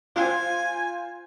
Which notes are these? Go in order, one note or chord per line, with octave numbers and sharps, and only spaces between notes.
F4 C5 G#5